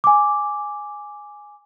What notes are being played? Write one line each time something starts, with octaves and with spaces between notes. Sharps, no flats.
G#5 D6